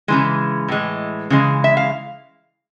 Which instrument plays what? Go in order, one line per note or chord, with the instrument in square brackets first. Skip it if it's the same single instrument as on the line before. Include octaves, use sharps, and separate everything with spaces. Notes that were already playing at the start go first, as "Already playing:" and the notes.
[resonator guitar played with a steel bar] C#3 E3 G#3
A2 E3 G#3
C#3 E3 G#3
E5
F5